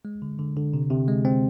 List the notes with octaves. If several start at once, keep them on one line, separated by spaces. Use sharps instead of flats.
G#3
D3
D3
D3
C3
C3
G#3
C4